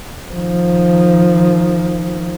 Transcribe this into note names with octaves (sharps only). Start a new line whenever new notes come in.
D#3 F3